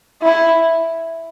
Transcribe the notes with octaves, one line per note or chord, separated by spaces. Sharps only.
E4